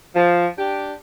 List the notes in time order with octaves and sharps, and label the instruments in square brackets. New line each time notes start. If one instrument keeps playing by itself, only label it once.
[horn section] F3
D4 G4